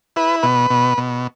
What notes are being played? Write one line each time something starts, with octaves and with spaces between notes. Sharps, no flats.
E4 B4
B2 B4
B2
B2